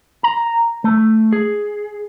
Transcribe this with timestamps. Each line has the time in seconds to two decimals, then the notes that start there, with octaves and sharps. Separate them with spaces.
0.23 A#5
0.84 A3
1.33 G#4